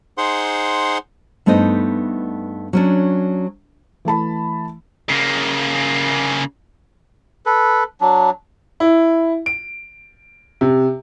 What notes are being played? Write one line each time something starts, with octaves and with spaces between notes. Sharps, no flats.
D#4 G#4 C5 F#5 C6
G2 A3 B3 D#4 C5 D#5
F#3 C#4 D4
E3 A3 A5 B5
C#3 A#3
A4 B4
F#3 D4
E4
D7
C3